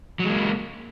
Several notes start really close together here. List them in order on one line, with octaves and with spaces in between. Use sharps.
F#3 G#3 A#3